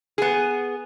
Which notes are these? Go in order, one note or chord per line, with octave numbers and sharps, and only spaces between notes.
B3 G#4